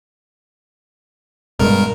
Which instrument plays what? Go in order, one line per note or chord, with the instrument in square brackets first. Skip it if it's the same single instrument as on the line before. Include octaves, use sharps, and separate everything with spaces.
[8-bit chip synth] G2 A#4 [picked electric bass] B2 G#3